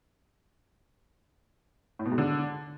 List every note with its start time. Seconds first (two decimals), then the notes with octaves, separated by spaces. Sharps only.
1.99 A2
2.06 B2
2.12 G#2
2.18 D3